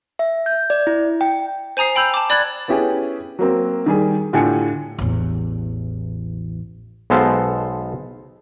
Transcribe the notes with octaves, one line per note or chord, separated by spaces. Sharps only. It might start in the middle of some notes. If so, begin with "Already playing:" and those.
E5
G6
D5
E4
G5
C5 G#5 A#5 D#6 C7
G5 B5 E6 G6 F7
A5 D6
D5 B5 F#6 G#6 A6
B3 C#4 E4 G4 G#4
F#3 A#3 C4
D#3 G3 G#4
A2 D3 F4 G4 G#5 C#7
A1 E2
B1 G#3 B3 A4 C5 F5